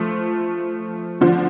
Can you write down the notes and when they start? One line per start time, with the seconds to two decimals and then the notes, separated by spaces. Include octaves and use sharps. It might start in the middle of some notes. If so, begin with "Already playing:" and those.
Already playing: F3 A3
1.21 D3 F3